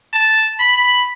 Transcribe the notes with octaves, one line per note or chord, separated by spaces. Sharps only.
A5
B5